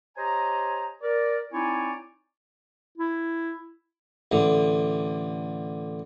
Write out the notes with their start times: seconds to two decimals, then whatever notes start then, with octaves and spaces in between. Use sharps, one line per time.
0.18 G4 C5 C#5 D#5 G#5 A#5
1.03 A#4 D5
1.53 C4 D#4 E4 C#5 D5 G#5
2.98 E4
4.32 A1 D3